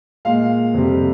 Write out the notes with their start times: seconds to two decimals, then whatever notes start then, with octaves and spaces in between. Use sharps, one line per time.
0.25 A#2 G#3 F5
0.74 F2 C3 G3